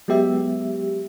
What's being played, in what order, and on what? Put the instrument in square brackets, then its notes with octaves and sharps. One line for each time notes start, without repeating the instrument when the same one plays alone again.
[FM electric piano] F#3 G#3 B3 G4 E5